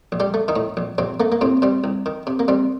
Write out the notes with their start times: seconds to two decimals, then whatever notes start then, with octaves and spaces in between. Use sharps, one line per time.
0.12 A#1
0.20 G3 G4
0.34 A3
0.48 D#3 D#4
0.56 A2
0.77 A#1
0.98 A#1 C3 C4
1.20 A3 A#3
1.32 A#3
1.41 A2 C3 C4
1.62 C3 G3 C4
1.84 C2
2.06 D#3
2.27 C3
2.39 A#3
2.48 C3 G3 C4